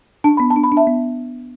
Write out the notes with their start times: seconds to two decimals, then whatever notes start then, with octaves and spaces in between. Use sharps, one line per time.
0.24 D4 A5
0.37 B3 B5
0.50 A5
0.56 D4
0.64 B5
0.72 D4
0.77 E5 A5
0.87 B3